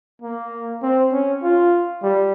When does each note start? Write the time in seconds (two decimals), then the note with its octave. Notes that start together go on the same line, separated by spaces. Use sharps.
0.22 A#3
0.82 C4
1.12 C#4
1.43 F4
2.03 G3